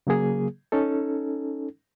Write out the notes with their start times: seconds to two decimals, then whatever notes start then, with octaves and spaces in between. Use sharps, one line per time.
0.07 C#3 F#3 A#3 G#4
0.72 C#4 D#4 A4